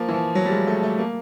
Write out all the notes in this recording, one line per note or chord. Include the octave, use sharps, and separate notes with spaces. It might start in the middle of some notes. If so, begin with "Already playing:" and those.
Already playing: F3 A#3
E3
F3
F#3
G3
G#3
A3
A3
A#3